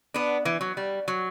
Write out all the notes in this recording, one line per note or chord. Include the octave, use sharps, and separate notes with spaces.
B3 D4
E3
F#3
G3
F#3